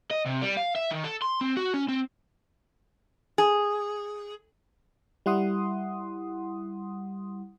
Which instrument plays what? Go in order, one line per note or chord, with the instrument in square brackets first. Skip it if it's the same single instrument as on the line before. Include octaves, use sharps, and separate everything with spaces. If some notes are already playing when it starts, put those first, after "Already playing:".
[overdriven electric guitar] D#5
C3
G3
F5
E5
D#3
A4
C6
C4
F#4
C#4
C4
[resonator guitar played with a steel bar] G#4
[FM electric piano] G3 E4 F#5 C6 D#6